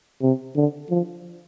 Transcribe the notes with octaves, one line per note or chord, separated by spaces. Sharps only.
C3
D3
F3